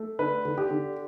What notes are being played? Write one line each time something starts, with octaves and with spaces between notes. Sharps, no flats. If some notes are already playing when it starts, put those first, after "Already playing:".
Already playing: A3
D3 B4
D3
G4
D3